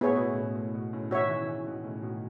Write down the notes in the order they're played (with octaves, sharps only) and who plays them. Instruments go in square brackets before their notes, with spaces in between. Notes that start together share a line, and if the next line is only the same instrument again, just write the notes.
[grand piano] A2 [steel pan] B3 E4 G#4 C#5
[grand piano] B2
A2 C#3
B2
A2
B2
A2 C#3
[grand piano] B2 D#3 [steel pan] F#4 C#5 E5
[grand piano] C#3 E3
C#3 E3
B2 D#3
A2 C#3
B2 D#3